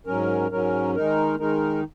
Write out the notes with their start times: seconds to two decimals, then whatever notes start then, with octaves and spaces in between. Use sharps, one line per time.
0.06 G#2 F#3 C#4 A#4
0.51 G#2 F#3 C#4 A#4
0.95 D#3 G#3 D#4 A#4
1.39 D#3 G#3 D#4 A#4